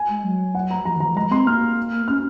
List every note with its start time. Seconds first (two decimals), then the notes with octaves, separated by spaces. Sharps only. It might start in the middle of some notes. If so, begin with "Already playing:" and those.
Already playing: G#5
0.09 G#3
0.24 F#3
0.55 F#5
0.71 A#5
0.85 F3 A#5
0.96 D#3 A#5
1.06 F3
1.16 G#3 A#5
1.31 C4 C6
1.47 A#3 F6
2.08 C#4 F6